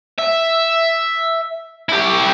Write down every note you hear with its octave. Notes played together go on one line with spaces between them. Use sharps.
E5
E4 G4